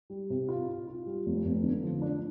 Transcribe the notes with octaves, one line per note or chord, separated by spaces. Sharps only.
G3
C3
F4
F4
F4
G3
F1
F1
D3
F3
D4